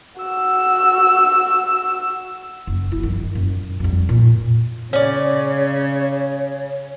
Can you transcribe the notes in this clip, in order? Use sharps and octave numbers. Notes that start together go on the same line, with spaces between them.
F#4 E6
F#1
E4
G2 D#3
F#2
F2 G3
A#2
C#3 C#4 C#5 D5